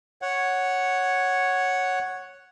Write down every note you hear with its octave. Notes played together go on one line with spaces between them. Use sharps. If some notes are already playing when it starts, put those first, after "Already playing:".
C#5 F#5